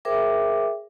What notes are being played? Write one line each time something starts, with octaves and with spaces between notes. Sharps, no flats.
G#4 A#4 C5 E5 G5 D6